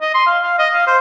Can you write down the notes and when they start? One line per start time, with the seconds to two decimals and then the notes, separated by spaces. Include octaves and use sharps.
0.01 D#5
0.14 C6
0.27 F5
0.43 F5
0.59 D#5
0.74 F5
0.87 C5